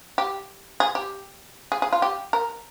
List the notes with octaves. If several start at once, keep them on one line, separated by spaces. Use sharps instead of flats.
G4
G#4
G4
G#4
G#4
F4
G4
A#4